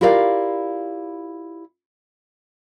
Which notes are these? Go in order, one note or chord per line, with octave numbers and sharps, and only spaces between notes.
E4 F4 G4 A#4 D5 F5